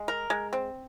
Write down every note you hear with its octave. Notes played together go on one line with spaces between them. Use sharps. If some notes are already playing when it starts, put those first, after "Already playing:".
Already playing: G#3
A#4
G#3
C4